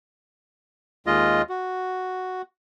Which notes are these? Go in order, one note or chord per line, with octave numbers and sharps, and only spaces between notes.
D#2 G#3 F4 D#5
F#4